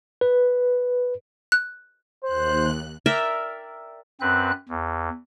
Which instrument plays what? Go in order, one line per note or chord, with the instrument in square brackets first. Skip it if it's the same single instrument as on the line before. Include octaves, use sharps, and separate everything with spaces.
[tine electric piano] B4
[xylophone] F#6
[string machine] D#2 F#6 [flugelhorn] C5
[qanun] A#4 D5 E5 G5
[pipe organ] F#2 C4 B4 F#6
E2